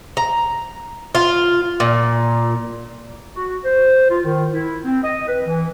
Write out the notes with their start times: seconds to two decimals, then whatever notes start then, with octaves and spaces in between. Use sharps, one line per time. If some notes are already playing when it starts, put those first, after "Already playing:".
0.17 A#5
1.15 F4
1.80 A#2
3.36 F#4
3.65 C5
4.10 F4
4.25 D#3
4.53 E4
4.85 C4
5.04 D#5
5.28 B4
5.47 E3